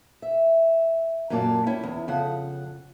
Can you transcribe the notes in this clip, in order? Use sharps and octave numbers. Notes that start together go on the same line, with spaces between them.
E5
F#2 A#2 F#3 A#3 D5 A5
C#4 E4 G5
E2
F2 C#3 F#5